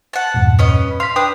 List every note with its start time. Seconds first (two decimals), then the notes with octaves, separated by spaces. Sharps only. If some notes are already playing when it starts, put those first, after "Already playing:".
0.13 F#5 A5
0.34 E2 G2 A#2
0.59 B3 C#4 D#5
1.00 F5 C6 B6
1.16 D4 B4 G5 D#6